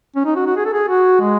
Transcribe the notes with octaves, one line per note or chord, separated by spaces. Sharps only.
C#4
D#4
F#4
F#4
G#4
A4
G#4
F#4
G#3